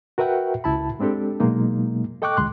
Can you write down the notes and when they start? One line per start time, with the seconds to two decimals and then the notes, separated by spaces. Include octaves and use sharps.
0.18 F#4 A#4 B4 E5 F#5 G5
0.64 C#2 E4 A5 B5
0.99 G#3 C4 D4 G4 A4
1.40 B2 F#3 G#3 A#3 D#4
2.22 A4 D#5 G5 C#6 D6 F#6
2.37 C#2 D#3 G#3 C6 F#6